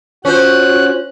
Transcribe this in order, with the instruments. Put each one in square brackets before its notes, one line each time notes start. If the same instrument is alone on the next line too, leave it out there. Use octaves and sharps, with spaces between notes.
[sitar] C#4 C5 [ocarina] F4 [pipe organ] F#4 F#6